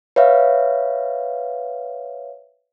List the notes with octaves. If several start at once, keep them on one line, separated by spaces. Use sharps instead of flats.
B4 C#5 E5 F5